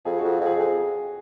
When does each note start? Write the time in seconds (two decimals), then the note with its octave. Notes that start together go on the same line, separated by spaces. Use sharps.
0.05 F2 G#4
0.19 F2 F#4
0.41 F2
0.46 G#4
0.59 F2 G#4